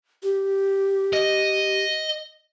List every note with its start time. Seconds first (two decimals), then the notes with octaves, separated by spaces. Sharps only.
0.23 G4
1.13 D#5